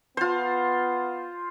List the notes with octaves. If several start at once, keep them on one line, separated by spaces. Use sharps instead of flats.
B3 F4 C5